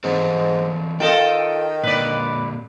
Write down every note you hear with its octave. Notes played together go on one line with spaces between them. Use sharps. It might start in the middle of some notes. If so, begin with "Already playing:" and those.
G#2 E3 C4 A4
D#3 F4 A4 D#5 G5
A#2 D3 B4 D5